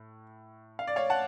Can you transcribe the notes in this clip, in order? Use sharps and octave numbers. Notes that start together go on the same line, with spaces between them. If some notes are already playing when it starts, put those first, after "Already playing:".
Already playing: A2
F5
D5
C#5 F5
F#5 A5